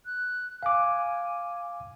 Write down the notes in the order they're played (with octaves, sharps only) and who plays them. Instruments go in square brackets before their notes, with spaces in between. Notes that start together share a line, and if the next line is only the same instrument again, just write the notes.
[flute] F#6
[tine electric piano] F5 D6 [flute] G#5